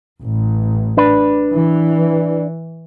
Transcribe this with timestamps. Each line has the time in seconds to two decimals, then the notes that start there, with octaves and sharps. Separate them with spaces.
0.23 A1
0.97 D4 B4
1.53 E3